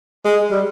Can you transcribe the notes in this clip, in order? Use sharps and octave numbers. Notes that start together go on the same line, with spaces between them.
G#3
G3